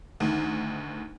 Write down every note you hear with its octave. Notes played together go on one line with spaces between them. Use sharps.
D2 D#3